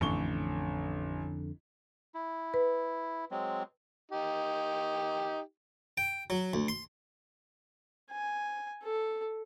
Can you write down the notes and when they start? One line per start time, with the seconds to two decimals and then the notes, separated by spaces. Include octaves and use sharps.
0.01 A1 F2 D3 C#6 G7
2.14 E4
2.54 B4
3.31 F#3 G#3 C4
4.12 D#4 G4
5.98 G5
6.30 F#3
6.54 D2
6.68 C6
8.11 G#5
8.84 A4